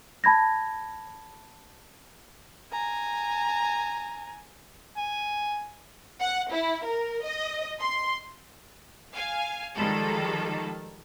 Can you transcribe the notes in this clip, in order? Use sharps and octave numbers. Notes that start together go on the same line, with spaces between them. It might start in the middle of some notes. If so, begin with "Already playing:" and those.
A5 B5 G#6 A#6
G#5 A#5
G#5
F#5
E4
A#4
D#5
C6
F5 G#5
D#3 F3 G3 G#3 A4